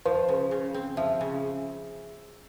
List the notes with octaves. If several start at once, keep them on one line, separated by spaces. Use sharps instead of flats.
F3 C5
C#3
C#3
C4
F3 E5
C#3